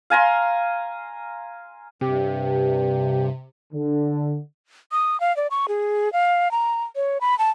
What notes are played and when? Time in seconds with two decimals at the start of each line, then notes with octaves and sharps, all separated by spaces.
0.10 F5 G#5 A#5 C6
2.01 G2 C3 G4
3.73 D3
4.92 D#6
5.20 F5
5.37 D5
5.51 C#6
5.68 G#4
6.13 F5
6.51 A#5
6.96 C#5
7.21 B5
7.39 A5